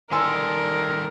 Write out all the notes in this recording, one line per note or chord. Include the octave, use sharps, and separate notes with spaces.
D#3 G3 A4 A#4 G#5 C6 E6